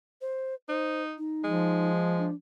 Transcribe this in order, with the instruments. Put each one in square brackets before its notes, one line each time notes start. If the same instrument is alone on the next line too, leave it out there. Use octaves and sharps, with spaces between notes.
[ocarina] C5
[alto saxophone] D#4 [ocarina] C5
[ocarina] D#4
[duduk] F3 [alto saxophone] G#3
[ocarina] D4